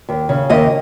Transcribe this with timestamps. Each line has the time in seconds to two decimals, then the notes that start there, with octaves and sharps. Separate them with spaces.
0.09 D#2
0.29 C#3
0.50 D#2 D#5